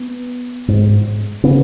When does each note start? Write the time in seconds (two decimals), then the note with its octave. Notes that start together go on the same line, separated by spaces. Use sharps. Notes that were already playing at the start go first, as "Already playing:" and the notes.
Already playing: B3
0.68 G#2
1.43 C#3 B3